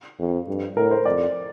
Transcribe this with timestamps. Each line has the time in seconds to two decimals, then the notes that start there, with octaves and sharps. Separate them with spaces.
0.19 F2
0.47 G2
0.77 A2 A#4
0.91 C5
1.05 F2 D5